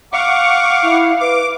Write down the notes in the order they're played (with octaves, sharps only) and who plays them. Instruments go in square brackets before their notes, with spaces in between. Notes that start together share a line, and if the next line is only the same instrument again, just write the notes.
[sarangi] F5 [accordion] F#5 C#6 D6
[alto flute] E4
[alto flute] B4 [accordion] D6